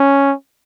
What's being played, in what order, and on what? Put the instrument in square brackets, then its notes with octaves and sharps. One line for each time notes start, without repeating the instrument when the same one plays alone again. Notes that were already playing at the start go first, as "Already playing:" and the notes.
Already playing: [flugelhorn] C#4